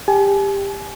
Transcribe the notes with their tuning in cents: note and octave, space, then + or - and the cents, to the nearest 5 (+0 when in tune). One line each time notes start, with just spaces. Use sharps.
G4 +20 G#5 +40